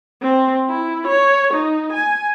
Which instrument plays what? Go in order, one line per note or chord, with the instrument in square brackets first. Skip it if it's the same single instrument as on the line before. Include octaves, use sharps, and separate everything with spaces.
[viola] C4
E4
C#5
D#4
G#5